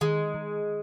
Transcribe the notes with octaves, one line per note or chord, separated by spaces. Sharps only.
D#3 G#3
D#3